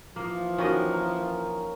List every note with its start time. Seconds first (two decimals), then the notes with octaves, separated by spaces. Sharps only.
0.16 E3 F3 A#3
0.58 D#3 A#3 C#4 F#4 A#4 D#5
0.93 A#5